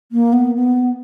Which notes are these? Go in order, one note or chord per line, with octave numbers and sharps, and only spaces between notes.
A#3
B3
B3